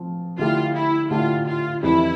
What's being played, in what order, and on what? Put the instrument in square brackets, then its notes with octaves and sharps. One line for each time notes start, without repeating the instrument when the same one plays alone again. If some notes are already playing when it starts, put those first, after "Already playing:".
Already playing: [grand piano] F3 C4 F4
[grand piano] D3 A3 E4 G4 [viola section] F4
[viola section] E4
[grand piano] D3 A3 E4 G4 [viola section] F4
[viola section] F4
[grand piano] F2 E3 G3 [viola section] E4